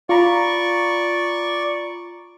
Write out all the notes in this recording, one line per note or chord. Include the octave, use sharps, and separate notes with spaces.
F4 D5 A#5 B5 C#6